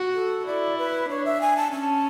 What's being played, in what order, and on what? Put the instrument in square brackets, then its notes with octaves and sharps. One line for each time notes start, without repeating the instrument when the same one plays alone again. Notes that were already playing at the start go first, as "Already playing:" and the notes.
Already playing: [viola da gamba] F#4
[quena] A4
[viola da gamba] E4 [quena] D5
[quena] B4
[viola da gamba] D4 [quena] C#5
[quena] E5
G#5
A5
[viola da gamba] C#4 [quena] A5